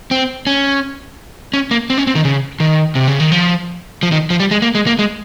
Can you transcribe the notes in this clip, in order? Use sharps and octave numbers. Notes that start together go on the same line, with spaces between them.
C4
C#4
C#4
A#3
C4
C#4
C4
D#3
C#3
D#3
C3
C#3
D#3
F3
F3
D#3
F3
G3
G#3
A#3
G#3
A#3
G#3